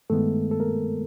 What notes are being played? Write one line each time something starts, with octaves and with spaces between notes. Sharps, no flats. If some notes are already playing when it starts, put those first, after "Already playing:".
G2 D#3 G#3 A3 B3 A4
A4
A#3 A#4